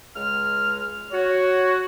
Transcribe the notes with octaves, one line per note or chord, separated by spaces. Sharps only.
C#2 G#3 F6
F#4 C#5